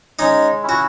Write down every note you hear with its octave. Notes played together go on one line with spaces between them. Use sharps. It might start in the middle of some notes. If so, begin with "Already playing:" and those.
G#3 C#4 D#4
C#4 E4
F#4